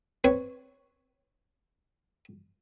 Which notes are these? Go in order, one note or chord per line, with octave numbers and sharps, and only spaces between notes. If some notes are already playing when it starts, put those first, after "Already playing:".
C4 B4 C#5